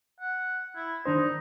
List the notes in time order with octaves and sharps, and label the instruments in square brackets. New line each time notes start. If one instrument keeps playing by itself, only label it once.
[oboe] F#5
E4
[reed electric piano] D#3 D4 C5 [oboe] D#4